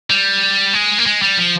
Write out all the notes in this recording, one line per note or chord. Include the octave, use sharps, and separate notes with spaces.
G3
G#3
A#3
G#3
G3
F3